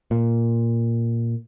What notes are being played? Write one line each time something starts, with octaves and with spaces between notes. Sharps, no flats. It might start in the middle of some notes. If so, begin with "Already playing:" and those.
A#2